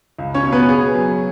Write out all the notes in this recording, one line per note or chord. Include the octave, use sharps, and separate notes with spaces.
C#2
C#4 C#5
B2
B3 B4
C#3 G#4
F#3